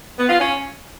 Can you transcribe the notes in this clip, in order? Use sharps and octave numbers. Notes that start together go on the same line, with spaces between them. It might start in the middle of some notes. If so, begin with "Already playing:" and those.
B3
F4
C#4